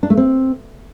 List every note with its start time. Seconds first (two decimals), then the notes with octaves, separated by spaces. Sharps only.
0.03 D4
0.10 A3
0.17 C4